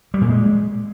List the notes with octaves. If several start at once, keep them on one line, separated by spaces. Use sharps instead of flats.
G3
A#2
G#3